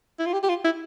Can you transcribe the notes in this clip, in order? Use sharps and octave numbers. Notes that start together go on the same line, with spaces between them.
E4
F4
G4
G4
F4
E4